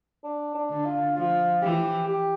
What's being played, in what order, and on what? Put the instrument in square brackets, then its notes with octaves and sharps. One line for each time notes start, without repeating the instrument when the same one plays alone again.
[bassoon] D4
D4
[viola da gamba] D3
[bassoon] F4
[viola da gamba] F3 [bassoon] F4
[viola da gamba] E3 [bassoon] G4
[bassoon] G4